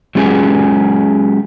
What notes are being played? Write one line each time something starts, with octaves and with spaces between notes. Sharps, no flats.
F#3 G#3 C#4 F4 G4 G#4